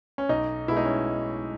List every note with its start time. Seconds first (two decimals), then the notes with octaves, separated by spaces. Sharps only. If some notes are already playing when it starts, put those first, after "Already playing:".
0.18 C#4
0.29 B1 D#4
0.68 B2 G#3 E4
0.77 D#4
0.85 C#4